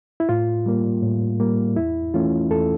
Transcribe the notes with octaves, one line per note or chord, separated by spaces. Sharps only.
E4
A2 F4
G3 A#3
A2
G3 A#3
E2 E4
E3 A3 C#4 F4
E2 A4